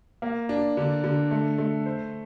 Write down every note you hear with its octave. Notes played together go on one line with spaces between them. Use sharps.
A#3
D4
D3
D3
A3
A3
C5